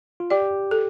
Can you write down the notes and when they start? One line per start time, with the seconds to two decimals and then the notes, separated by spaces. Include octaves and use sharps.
0.20 F4
0.30 G4 D5
0.71 A4